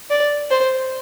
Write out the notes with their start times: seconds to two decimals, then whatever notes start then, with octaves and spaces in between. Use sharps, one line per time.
0.10 D5
0.50 C5